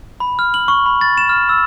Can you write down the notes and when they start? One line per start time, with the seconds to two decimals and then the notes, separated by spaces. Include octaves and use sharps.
0.20 B5
0.39 F6
0.54 F#7
0.68 C#6
0.86 B5
1.01 A6
1.18 E7
1.29 F6
1.49 E6